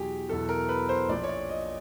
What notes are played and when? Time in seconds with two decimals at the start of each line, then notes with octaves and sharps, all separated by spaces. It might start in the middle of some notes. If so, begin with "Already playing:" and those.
Already playing: E2 B2 F#3 G4 G#4
0.29 E2 B2 F#3 A4
0.49 A#4
0.69 B4
0.89 C5
1.09 A#1 A#2 F3 D5
1.24 C#5
1.29 D5
1.49 D#5